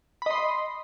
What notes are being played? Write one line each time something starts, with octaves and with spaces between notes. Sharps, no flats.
D#5 B5 C6